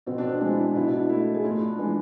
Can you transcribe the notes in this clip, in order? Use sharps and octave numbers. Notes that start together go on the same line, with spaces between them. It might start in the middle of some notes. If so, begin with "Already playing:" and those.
B2 C4
D4
C4
G#3 D4
E4
D4
B2 E4
D4
E4
A3 E4
G#4
A2 F4
D4
E3 G#3